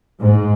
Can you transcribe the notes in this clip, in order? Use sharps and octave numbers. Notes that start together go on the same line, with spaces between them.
G#2